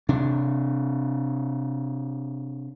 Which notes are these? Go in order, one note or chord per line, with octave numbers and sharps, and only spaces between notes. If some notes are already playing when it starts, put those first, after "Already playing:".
C3 D4